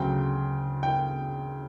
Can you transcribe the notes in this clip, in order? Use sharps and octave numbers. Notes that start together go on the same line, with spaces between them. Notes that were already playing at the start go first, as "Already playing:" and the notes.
Already playing: D2 C#3 F#3 G5
G5